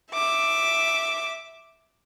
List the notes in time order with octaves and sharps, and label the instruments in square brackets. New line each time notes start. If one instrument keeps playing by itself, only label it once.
[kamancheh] E5 D6